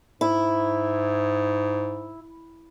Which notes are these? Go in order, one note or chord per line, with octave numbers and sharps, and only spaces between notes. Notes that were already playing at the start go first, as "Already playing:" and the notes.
G#2 E4